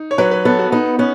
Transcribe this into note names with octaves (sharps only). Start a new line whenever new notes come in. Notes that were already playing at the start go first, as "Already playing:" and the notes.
Already playing: D#4
C#5
F#3 B4
B4
B3 A4
F#4
B3 D#4
B3 C#4